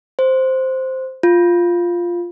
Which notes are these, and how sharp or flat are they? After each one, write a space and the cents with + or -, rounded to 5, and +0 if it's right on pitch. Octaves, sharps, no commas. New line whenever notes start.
C5 +0
F4 +0